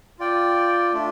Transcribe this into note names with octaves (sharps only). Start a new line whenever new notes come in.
F4 D5 G5
A3 D4 F4